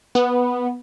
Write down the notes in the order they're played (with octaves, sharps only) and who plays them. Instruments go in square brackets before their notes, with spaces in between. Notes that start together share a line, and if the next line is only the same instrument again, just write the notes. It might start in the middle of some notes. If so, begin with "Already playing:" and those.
[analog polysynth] B3